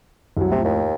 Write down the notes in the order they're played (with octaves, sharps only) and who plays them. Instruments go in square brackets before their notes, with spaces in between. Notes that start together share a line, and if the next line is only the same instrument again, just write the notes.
[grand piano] C2 F#3
[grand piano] F2 A2 [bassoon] C3
[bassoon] D#2